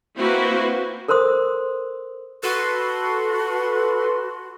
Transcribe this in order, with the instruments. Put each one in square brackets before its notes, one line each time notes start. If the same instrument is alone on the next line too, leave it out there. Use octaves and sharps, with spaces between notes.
[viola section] A#3 C4 E4 F#4 B4 C5
[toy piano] A4 A#4 C5 C6 D#6
[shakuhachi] F#4 [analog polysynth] A4 B4 C6